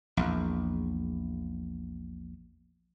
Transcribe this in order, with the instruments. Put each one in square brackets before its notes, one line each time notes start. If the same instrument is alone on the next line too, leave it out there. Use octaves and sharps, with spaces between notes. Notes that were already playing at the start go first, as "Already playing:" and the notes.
[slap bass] A#1 E2